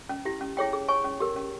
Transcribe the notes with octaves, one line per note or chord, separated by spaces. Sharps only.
C#4
E4 G4
C#4
E4 G#4 C#5 G5
G#4
C#5 G#5 C#6
C#4
G4 A#4
C#4